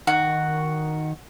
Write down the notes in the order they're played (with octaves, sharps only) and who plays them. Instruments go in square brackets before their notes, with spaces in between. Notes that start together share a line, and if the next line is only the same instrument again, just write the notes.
[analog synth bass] D#3 [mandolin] F#4